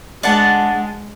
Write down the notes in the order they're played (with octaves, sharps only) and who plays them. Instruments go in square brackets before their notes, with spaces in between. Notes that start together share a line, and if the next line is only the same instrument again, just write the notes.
[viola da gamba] G#3 [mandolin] D4 F#5 A5